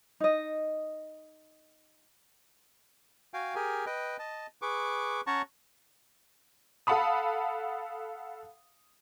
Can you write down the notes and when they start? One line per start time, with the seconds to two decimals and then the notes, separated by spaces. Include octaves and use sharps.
0.20 D#4 D#5
3.34 F#4 F5 G5 G#5
3.55 G4 G#4 A#4 G#5
3.86 B4 D#5 G5
4.19 D#5 A5
4.62 G#4 B4 C#6 D6
5.27 C#4 C#5 F#5 A5 A#5 C#6
6.87 A4 F5 F#5 A5 B5 D#6